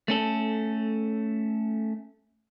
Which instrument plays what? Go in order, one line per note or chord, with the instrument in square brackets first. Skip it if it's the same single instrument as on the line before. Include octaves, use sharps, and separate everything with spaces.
[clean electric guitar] A3 C#4 A4